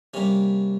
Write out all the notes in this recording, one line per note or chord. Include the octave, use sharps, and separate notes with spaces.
C3 G3 A#3 C#4